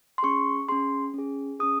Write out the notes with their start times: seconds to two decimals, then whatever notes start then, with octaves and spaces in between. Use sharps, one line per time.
0.18 C6
0.23 C#4 G#4 C#6
0.69 C#4 G#4 C6
1.14 C#4 G#4
1.59 C#4 G#4 D#6